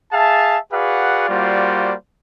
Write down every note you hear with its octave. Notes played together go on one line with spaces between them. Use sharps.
G#4 E5 F5 A5
F#4 G#4 B4 D5 F5 F#5
G3 A#3 F4 F#4 C5 D5